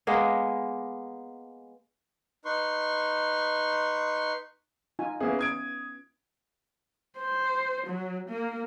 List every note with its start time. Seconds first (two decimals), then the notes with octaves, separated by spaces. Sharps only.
0.07 G#3 A#3 B3
2.45 D#4 B4 C6 C#6
4.99 D#4 F4 G#5
5.20 E3 A#3 B3 C#4 G#4 E5
5.39 D#6 G#6 D7
7.18 C5
7.87 F#3
8.29 A#3